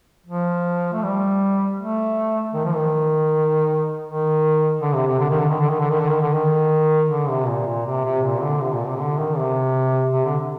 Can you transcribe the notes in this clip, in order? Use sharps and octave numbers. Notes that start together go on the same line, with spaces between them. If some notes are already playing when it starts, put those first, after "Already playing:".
F3
A3
G3
A3
D#3
F3
D#3
D#3
D3
C3
C3
D3
D#3
D3
D#3
D3
D#3
D3
D#3
D3
D#3
D3
D#3
D3
C3
A#2
A#2
C3
C3
A#2
D3
C3
A#2
C3
D3
D#3
C3
C3
D3